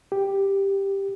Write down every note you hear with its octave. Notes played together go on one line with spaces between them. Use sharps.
G4